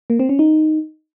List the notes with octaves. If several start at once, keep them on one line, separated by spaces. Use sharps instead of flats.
A#3
C4
C#4
D#4